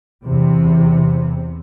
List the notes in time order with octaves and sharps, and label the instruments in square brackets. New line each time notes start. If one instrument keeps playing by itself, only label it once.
[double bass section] E2 C3